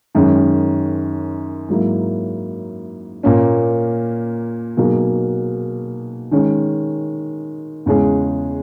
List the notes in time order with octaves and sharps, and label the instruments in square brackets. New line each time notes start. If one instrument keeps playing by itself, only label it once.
[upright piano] F#2 D#3 G#3 C#4
G#2 F#3 A#3 E4
A#2 A#3 C#4
B2 F#3 A#3 D#4 G#4
D#3 G#3 C#4
E2 C#3 G#3 C#4 G#4